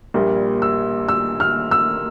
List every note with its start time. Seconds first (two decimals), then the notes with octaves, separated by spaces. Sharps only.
0.14 A#1 A#2 G3
0.62 E6
1.09 E6
1.40 F6
1.71 E6